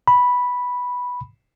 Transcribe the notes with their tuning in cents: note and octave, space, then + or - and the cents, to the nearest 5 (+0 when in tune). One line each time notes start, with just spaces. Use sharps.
B5 -5